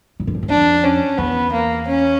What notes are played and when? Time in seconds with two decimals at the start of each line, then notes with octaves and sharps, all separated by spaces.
0.20 A2
0.27 G#2
0.35 G2
0.43 F#2
0.50 F2 D4
0.84 C#4
1.18 E2 B3
1.52 A#3
1.87 C#4